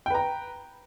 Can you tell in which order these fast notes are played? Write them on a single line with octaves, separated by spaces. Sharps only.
G5 B4 A#5